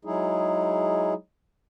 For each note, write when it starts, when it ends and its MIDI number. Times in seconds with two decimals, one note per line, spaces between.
0.05 1.14 54
0.05 1.14 56
0.05 1.14 63
0.05 1.14 64
0.05 1.14 68